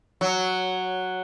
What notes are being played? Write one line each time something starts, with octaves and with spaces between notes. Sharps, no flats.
F#3